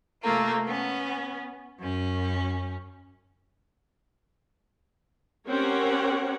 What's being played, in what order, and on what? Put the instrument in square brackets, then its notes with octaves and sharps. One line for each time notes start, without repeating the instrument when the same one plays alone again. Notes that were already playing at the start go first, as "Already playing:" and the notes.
[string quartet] C3 A3 A#3 F4
B3 C#4
F#2 C#4
[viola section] C4 C#4 G4 A#4 C#5 F#5